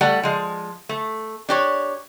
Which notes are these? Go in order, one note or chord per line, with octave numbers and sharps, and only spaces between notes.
G3 A3 F#5
F3 G#3
A3
D4 G4 C#5